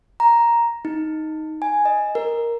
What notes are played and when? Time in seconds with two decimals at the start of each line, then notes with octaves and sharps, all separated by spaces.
0.20 A#5
0.85 D#4
1.62 G#5
1.85 D#5
2.15 A#4